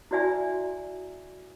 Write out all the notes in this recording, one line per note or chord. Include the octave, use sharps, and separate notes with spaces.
E4 F#4 D5 E5 G#5 A#5